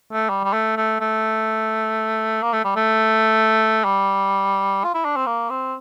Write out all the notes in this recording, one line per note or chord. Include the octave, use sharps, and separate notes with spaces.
A3
G3
G3
A3
A3
A3
A#3
A3
G3
A3
G3
F4
E4
D4
C4
A#3
C4